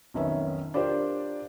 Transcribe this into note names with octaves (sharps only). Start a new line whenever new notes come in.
B1 F2 D#3 C#4 B4 E5
D4 F4 G4 A#4 C5 D5